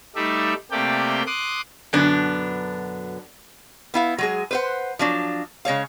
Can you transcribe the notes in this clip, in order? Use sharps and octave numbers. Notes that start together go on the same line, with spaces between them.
G3 A3 D#4 D5 E5
C3 A3 A#3 G4 D5 G5
C6 D6 D#6 F#6
F#2 B2 D3 B3 D4
B3 E4 F5
F#3 G#3 G#4
B4 C5 F#5
F3 F#3 D4
C#3 G#3 C#5 F5